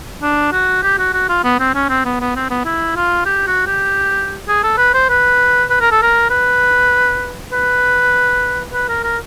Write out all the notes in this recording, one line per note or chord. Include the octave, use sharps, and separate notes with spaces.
D4
F#4
G4
F#4
F#4
F4
B3
C4
C#4
C4
B3
B3
C4
B3
E4
F4
G4
F#4
G4
G#4
A4
B4
C5
B4
B4
A#4
A4
A#4
B4
B4
B4
A#4
A#4